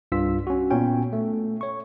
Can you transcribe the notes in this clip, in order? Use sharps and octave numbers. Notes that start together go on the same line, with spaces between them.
C2 G2 F4 E6 B6
C#4 F#4
A#2 B3 C#4 G5
A3
C#5 C#6